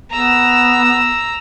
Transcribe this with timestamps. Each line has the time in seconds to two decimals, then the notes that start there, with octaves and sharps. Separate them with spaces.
0.11 B3 A#5 E6